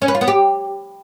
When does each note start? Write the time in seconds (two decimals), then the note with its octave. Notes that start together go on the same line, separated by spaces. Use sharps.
0.02 C#4
0.08 B4
0.15 F4
0.21 B3
0.28 G4